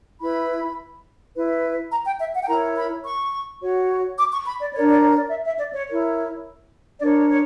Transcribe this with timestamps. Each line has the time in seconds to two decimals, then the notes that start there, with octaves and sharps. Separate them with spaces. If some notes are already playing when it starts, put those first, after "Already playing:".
0.21 E4 B4 B5
1.35 E4 B4
1.91 A#5
2.05 G5
2.20 E5
2.34 F#5
2.42 G5
2.47 E4 A#4 C#5 A#5
2.76 B5
3.04 C#6
3.61 F#4 C#5
4.18 D6
4.32 C#6
4.46 B5
4.61 D5
4.74 D4 A#4 C#5 D5
4.89 D5
5.02 C#5
5.16 D5
5.30 E5
5.46 E5
5.59 D5
5.74 C#5
5.88 E4 A#4 C#5
7.00 D4 A#4 C#5 D5
7.30 C#5